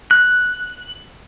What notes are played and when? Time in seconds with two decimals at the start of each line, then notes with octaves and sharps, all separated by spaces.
0.11 F#6